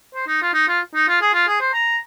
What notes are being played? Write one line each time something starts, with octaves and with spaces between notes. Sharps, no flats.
C5
D#4
F4
D#4
F4
D#4
F4
G#4
F4
G#4
C5
A#5